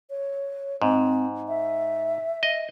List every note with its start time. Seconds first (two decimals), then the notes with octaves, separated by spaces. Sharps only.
0.10 C#5
0.82 G#2 C4
1.49 E5
2.43 D#5